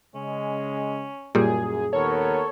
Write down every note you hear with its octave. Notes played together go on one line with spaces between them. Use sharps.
C#3 G#3 C#4
F#2 A#2 G3 G#4
D#2 B3 A4 A#4 C#5